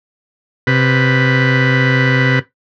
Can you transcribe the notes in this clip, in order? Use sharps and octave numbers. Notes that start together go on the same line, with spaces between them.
C3 B4